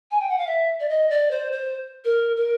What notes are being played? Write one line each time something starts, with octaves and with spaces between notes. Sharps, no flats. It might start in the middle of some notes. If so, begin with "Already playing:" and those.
G#5
G5
F#5
F5
E5
D5
D#5
D5
C5
C5
A#4
A#4